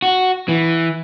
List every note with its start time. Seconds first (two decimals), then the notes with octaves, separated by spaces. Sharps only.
0.02 F#4
0.48 E3